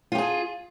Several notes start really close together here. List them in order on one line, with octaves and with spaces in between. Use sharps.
F4 G4 G#4